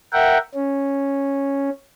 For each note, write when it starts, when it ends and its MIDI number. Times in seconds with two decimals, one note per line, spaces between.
0.13 0.38 70
0.13 0.38 76
0.13 0.38 78
0.13 0.38 79
0.54 1.70 61